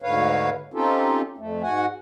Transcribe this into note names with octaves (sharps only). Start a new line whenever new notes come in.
D2 G#2 D3 B4 C#5 F5
C4 C#4 D#4 F4 G4 A4
F2 A3
G#2 F#4 F#5 G#5